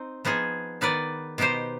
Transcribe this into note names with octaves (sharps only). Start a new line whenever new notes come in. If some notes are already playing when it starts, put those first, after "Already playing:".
Already playing: C4 D#4
F3 B3 D#4 G#4
D#3 B3 D#4 B4 D5
B2 B3 D#4 G4 C5